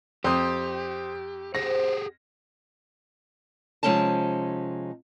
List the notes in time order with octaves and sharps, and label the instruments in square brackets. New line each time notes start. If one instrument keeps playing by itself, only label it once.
[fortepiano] F2 [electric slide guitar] G4 [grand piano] C5 D#6
[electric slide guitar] G4 G#4 F#5 [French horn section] C5 [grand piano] A#6
[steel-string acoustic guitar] C3 F3 G#3 C#4 D#4 A5